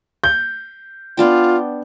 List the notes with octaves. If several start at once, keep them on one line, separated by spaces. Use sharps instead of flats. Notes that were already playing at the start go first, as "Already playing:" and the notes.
G6
B3 D4 F4 G5